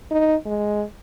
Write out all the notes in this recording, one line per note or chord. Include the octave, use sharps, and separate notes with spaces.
D#4
G#3